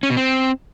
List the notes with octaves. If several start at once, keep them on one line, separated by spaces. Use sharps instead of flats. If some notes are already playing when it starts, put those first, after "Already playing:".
C#4
B2
C4